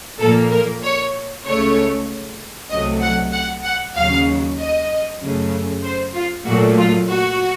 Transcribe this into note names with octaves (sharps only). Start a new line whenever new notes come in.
A#2 F3 A#3 A4
A#4
C#5
C#2 C#3 A3 C#5
C2 C3 F#3 A3 D#5
F#5
F#5
F#5
D#2 C#3 F#3 F5
D#5
F#2 C#3 A3
C5
F4
A#2 F#3 A3 F#4
F4
F#4